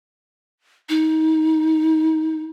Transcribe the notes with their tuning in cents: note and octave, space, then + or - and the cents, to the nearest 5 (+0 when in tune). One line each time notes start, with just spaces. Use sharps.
D#4 +25